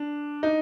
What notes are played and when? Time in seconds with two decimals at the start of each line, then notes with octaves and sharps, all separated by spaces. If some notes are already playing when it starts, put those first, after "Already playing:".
Already playing: D4
0.43 D#4